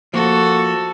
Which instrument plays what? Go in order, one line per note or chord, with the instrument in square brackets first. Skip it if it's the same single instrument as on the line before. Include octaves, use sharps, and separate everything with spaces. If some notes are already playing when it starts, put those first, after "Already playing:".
[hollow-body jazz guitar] F3 A#3 [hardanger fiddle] F#4 A4